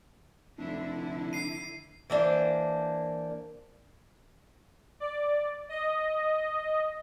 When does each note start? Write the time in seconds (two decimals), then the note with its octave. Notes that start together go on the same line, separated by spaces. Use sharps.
0.58 F1 D3 D4 E4
1.33 C7 D#7
2.10 E3 A#3 D4 C5
5.00 D5
5.69 D#5